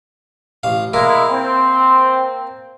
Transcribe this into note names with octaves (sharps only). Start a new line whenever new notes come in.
A1 F5
G#3 A#3 E4 A#4
C4